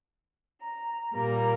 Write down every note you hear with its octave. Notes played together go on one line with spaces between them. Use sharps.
A#5
A#2 G3 A#3 A#5